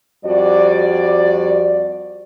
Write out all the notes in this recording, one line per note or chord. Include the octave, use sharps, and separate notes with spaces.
F2 G3 F#4 D5